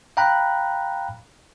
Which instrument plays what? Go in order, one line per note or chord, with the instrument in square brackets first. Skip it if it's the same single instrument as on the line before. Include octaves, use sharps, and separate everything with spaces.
[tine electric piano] F5 G5 A#5 B5 F#6